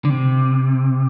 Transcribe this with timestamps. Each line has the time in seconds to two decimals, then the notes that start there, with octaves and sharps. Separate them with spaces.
0.05 D3
0.10 C3